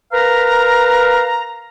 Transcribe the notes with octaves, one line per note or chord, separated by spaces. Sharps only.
A#4 B4 F5 A#5